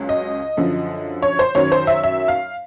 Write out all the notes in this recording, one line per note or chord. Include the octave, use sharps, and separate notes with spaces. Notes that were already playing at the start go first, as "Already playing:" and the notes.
Already playing: C#2 C#3 F#3
D#5
F#2 D3 F3
C#5
C5
F#2 D#3 F#3 C#5
C5
E5
E5
F5